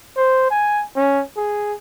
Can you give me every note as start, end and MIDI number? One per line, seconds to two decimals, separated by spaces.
0.16 0.50 72
0.50 0.83 80
0.96 1.22 61
1.37 1.74 68